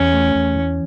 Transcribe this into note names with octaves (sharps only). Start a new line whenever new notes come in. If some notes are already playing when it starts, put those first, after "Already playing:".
Already playing: E2 C#4
A3
E2
E3